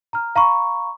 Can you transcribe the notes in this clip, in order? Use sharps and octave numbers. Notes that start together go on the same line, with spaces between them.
A#5 F6
F5 A#5 B5 C#6